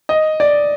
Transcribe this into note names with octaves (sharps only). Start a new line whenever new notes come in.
D#5
D5